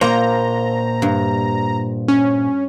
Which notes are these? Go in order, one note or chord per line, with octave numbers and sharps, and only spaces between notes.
A#2 A#3 C5 A#5
G2
C#4